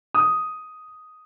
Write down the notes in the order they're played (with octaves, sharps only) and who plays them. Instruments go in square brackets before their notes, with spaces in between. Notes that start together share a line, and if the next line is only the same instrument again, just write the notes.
[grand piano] D#6